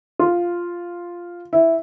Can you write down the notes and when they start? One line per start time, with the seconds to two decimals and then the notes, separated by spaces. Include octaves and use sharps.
0.19 F4
1.53 E4